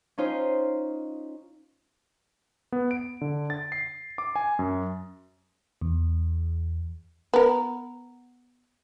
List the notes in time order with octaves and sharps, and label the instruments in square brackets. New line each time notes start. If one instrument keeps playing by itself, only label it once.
[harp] C#4 D#4 F4 C5
[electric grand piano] B3
D7
D3
A6
C7
D6
G#5
F#2
[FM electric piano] E2
[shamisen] B3 A#4